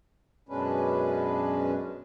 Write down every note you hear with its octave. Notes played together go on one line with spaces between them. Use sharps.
F#2 B2 G#3 C#4 D4 B4